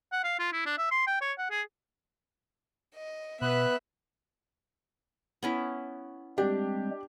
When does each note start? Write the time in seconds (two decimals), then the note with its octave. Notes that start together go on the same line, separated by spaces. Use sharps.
0.12 F#5
0.24 F5
0.39 F4
0.53 E4
0.66 D4
0.78 E5
0.91 C6
1.07 G5
1.21 C#5
1.38 F#5
1.51 G#4
2.95 D#5
3.41 B2 B3 B4 E5 F#6
5.43 B3 C#4 E4
6.38 G3 G#3 C4 D4 G4